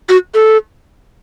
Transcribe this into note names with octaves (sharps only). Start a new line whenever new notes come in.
F#4
A4